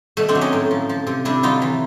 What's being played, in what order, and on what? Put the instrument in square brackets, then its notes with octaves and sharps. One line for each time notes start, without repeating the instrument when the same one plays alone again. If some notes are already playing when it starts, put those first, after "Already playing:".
[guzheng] B2 A3
C4 D4
F#3
C#4 D#4
A2
F3
F3
C3
C3 D4 E4
F#3 D#4 F4
E3